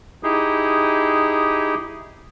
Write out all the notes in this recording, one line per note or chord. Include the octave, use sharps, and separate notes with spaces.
D#4 E4 G4 G#4